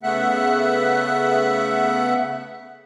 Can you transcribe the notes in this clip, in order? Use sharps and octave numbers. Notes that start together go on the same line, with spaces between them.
C#3 A3 B3 E5 F#5 F#6